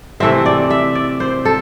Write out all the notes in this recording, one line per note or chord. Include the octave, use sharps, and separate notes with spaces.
C3 E3 A3 C4 E5
D5
E5
D5
C5
A4